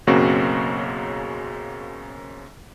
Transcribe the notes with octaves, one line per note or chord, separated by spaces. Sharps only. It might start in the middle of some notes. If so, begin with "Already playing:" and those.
B1 F#2 C#3 A#3 C4 F#4